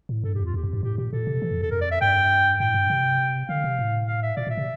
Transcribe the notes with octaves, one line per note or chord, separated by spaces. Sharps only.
A2
G2 A4
F2 G4
F4
E2 G4
F2
G2
A2 G4
A#2 G4
A#2 A4
C3
E3
F2
E2 A4
F2 A#4
D5
E5
G2 G5
A2 G5
G2
C3
D3 F5
C3
A2
F5
E5
A#2 D5
A#2 E5
C3